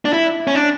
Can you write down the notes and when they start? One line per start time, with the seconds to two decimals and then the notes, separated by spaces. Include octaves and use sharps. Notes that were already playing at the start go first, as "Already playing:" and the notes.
0.05 D4
0.13 E4
0.47 C#4
0.55 D4